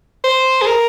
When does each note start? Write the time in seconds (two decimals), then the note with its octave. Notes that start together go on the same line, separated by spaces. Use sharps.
0.24 C5
0.62 G#4
0.67 A#4